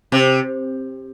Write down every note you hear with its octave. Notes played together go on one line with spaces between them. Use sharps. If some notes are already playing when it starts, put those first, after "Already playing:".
C3